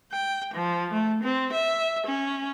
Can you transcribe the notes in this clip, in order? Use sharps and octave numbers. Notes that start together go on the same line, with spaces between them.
G5
F3
A3
C4
E5
C#4